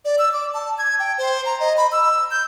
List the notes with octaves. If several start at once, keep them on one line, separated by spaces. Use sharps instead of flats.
D5
E6
D6
A5
G#6
G5
C5
A#5
D#5
B5
E6
G6